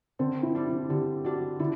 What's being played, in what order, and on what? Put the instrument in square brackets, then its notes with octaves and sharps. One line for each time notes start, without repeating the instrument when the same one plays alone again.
[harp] D3 [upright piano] C4
[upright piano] E4
[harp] G3 D4
[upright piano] E4
[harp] D3 [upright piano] G4
[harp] G3 D4 [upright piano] F#4
[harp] D3 [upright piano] E4